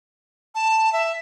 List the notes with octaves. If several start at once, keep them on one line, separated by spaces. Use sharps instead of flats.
A5
E5